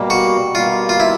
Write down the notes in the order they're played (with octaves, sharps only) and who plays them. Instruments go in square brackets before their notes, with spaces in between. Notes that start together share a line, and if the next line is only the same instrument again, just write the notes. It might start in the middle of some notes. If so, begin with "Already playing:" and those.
Already playing: [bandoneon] B2 G3 A#3
[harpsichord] F#4
[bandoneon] B2 G3 A#3 [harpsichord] F4
[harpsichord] F4
E4